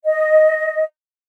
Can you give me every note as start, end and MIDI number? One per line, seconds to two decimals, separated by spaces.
0.05 0.83 75